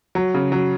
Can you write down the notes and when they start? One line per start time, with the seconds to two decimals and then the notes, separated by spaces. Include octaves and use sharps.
0.15 F#3
0.34 C#3
0.52 F#3